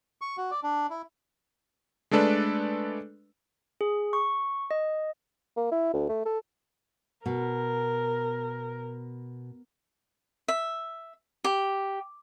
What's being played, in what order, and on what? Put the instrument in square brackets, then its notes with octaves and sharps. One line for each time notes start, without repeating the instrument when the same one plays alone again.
[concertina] C#6
F#4
D5
D4
E4
[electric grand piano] G#3 A3 D4 A4 B4 D5
[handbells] G#4
C#6
D#5
[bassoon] A#3
E4
D2
A3
A4
[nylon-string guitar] B2 [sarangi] A#4
[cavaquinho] E5
G4